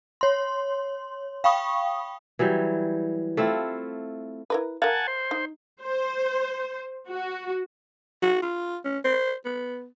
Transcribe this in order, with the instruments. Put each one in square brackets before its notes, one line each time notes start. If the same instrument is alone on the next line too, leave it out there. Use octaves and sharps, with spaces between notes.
[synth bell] C#5 C6
F5 G5 B5 C#6 D#6
[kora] E3 F#3 G3
A3 C4 E4 F4
[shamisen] E4 A#4 B4
[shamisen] A#4 F5 [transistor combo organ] F#5 G#5 A5
[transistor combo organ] C5
[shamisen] D#4
[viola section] C5
F#4
[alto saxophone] F#4
F4
C#4
C5
B3